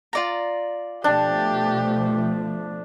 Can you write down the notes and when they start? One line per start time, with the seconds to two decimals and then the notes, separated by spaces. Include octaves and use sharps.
0.13 F4 D5 A#5
1.04 B2 F3 A3 D4 G4